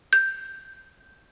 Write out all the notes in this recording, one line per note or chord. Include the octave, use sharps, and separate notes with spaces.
G6